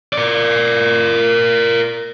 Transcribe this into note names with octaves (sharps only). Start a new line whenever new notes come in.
A#4 D5